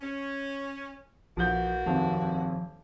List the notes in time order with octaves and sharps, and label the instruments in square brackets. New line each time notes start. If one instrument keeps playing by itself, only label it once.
[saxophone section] C#4
[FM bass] A#1 [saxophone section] E3 A#3 F#4 [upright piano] F3 G6
[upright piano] D#1 F2 [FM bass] F3